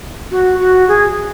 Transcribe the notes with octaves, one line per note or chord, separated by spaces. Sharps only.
F#4
F#4
G#4